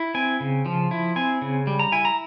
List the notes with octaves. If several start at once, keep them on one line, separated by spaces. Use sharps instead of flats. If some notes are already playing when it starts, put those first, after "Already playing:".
Already playing: E4
C4 G#5
C#3
F3
E4
C4 G#5
C#3
G3
A#5
E4 G#5
A#5